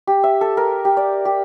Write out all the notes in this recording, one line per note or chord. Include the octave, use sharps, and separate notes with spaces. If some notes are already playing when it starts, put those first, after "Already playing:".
G4
E5
A4
A#4
G4
D5
G4